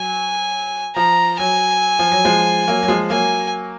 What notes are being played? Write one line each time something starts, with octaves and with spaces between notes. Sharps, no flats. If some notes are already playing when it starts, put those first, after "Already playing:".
Already playing: F#3 G#5
F3 A#5
F#3 G#5
F3
F#3
F3 G#3
F#3 A#3
F#3
F3 G#3
F#3 A#3 G#5